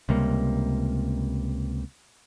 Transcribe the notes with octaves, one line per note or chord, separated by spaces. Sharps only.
C#2 C3 G3 A#3